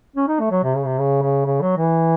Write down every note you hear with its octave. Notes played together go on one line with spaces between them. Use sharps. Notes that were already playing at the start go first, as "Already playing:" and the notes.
C#4
D#4
A3
F#3
C3
C#3
C3
C#3
C#3
C#3
F#3
E3